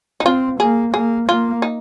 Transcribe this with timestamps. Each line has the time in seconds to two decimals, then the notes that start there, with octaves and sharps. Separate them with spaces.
0.20 D#4
0.25 C4 F4
0.60 A#3 G#4
0.94 A#3 G#4
1.29 A#3 F4
1.62 D#4